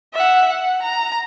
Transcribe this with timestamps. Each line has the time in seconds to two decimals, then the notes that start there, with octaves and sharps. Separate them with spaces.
0.14 E5 F#5
0.49 F#5
0.82 A#5